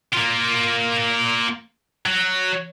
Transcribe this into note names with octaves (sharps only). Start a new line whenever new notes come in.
A#3 F4
F#3